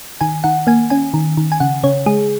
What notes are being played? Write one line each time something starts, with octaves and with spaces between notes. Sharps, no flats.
D#3 G#5
D#3 F#5
A#3 G#5
C#4 G#5
D#3
D#3
G#5
C#3 F#5
C#3 C#5
G#3 G#4